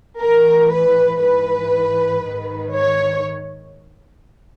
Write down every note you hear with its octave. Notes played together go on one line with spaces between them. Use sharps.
A2 E3 A#4
B4
G#2 E3 B4
G#2 D#3
C#5